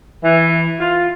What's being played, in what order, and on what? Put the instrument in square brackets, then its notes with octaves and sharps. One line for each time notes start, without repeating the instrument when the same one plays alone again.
[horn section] E3
F4